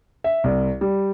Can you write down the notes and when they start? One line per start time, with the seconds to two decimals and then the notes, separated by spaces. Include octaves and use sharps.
0.24 E5
0.44 C2
0.81 G3